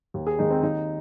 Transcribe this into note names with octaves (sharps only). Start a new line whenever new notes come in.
D#2
G#4
D#3 G#3 D#4
C4
D#2 D#4